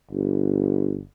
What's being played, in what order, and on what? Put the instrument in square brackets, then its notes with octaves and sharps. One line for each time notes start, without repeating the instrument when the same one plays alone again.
[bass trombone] G1